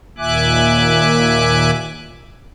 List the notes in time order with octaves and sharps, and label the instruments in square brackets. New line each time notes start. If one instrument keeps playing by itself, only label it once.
[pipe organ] D#2 A#2 E5 G#5 D6 F#6